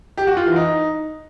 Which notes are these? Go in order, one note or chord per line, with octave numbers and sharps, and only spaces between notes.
G4
F#4
F4
E3
D#4